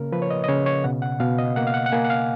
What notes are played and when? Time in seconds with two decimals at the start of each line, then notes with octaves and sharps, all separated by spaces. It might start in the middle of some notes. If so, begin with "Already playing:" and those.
Already playing: C#3 A#3 A#4
0.12 F3 B4
0.22 C#5
0.30 D#5
0.44 D#5
0.48 C#3 C#5
0.66 C#5
0.84 B2 F#5
1.02 F#5
1.20 B2 F5
1.38 D#5
1.56 A#3 F#5
1.67 F5
1.74 F#5
1.86 F#5
1.92 A#3 G#5
2.05 F#5
2.10 F5